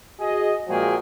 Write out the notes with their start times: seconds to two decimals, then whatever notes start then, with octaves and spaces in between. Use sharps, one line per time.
0.19 F#4 G#4 D#5
0.68 A#2 F3 G#3 F#4 G#4 G5